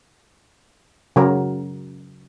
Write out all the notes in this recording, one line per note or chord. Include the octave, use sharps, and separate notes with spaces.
C#3 F#3 A#4